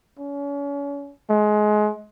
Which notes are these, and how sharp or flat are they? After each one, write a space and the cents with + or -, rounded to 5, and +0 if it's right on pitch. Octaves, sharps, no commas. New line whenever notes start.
C#4 +35
G#3 +25